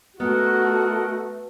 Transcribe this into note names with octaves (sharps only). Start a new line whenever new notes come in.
A3 B3 F#4 A#4 D#5 F#5